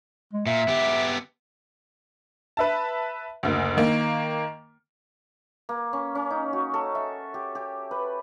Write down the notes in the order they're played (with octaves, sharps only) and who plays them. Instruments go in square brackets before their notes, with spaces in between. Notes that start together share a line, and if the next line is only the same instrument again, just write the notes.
[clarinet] G#3
[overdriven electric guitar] A#2 [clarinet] E5
[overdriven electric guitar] B3 G4
[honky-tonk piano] B4 E5 A5
F#1 D2
D#3 A#3
[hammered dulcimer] A#3
C#4
C#4
D#4
F#4
A4
E5
G4
G4
B4